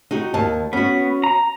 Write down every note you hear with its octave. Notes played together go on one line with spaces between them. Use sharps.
D#4 F#4 G4
D#2 D#5 A5
B3 C#4 F#4
A#5